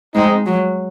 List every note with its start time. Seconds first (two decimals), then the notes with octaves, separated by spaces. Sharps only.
0.15 G#3 C4 D#4
0.46 F#3